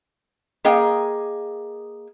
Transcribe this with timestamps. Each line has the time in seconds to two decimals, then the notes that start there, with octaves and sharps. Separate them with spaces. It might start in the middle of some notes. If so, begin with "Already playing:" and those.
0.65 A#3 G#4 D#5 G5